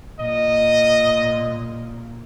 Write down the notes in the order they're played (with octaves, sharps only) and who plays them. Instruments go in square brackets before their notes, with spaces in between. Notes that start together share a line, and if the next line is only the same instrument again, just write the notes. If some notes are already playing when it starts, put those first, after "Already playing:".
[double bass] A#2 [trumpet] D#5